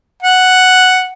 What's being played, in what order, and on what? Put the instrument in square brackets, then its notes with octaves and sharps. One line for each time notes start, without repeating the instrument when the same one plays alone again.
[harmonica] F#5